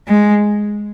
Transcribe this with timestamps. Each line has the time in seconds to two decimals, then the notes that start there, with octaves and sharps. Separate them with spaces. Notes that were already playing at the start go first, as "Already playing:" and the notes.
0.08 G#3